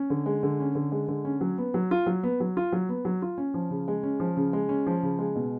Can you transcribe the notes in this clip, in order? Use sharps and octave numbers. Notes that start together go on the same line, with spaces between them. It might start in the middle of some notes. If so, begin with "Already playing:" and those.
Already playing: C#4
D3
G#3
D3
C#4
D3
G#3
D3
C#4
F#3
B3
F#3
F4
F#3
B3
F#3
F4
F#3
B3
F#3
F4
C#4
F3
C#3
G#3
C#4
F3
C#3
G#3
C#4
F3
C#3
G#3
B2